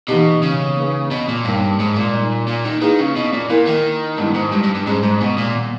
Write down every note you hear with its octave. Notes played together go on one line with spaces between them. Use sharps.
B2 E3 A#3 D#4 G4
C#3
A#3 D#4 G#4 B4
B2
A#2
G2 A#3 D#4 A#4 C#5
G#2
A#2
G3 A#3 D#4
A#2
D#3
D#3 A#3 E4 G#4 B4
C#3
B2
A#2
A#2 A#3 E4 A#4
D#3
G2 G#3 B3 E4
G#2
G2
G2
G2
G#2 G3 C#4 G#4
G#2
B2
A#2
D#3 G3 B3